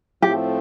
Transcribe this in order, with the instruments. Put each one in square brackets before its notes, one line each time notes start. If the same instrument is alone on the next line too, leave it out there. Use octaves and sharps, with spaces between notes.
[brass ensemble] A2 F3 A3 C4 [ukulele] G4